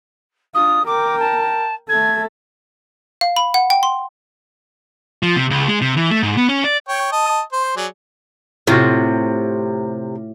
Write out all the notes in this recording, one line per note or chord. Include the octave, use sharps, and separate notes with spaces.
D4 F4 D#6
A#4 G5 D6
A5
A3 A4 G#6
F5
B5
F#5
G5
C6
F3
C3
C#2
G#3
C3
E3
A3
G#2
B3
C#4
D5
C#5 G5
D#5 A5 D#6
C5 C6
F#3 G#4 D5
A2 C3 F4 F#4